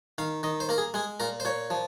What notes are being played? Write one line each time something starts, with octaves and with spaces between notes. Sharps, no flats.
D#3 F5
D#3 D#5
C5
A#3 A#4
G#4
G#3 G#4
A#2 A#4
C5
A#2 C#5
F3